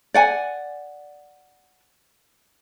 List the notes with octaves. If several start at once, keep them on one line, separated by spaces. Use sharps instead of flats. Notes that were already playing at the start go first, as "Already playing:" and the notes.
D5 F#5 G#5